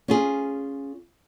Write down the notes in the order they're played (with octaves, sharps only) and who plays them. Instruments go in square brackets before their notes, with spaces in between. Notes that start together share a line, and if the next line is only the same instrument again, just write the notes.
[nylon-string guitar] C#4 F4 G#4